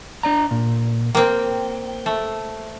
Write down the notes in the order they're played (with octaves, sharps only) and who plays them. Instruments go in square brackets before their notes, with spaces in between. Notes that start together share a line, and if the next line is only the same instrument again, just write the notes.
[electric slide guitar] D4 D5 A#5
A#2
[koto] A#3 C4 [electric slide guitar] G5
[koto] A3